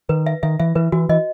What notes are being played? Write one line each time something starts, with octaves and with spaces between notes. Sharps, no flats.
D#3 B4
E5
D#3 E5
E3 E5
E3 B4
E3 F#4
E3 D#5